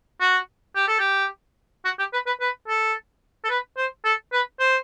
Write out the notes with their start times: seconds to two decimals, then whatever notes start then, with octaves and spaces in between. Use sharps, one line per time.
0.21 F#4
0.76 G4
0.88 A4
0.99 G4
1.85 F#4
1.99 G4
2.13 B4
2.26 B4
2.41 B4
2.68 A4
3.45 A4
3.50 B4
3.77 C5
4.05 A4
4.33 B4
4.60 C5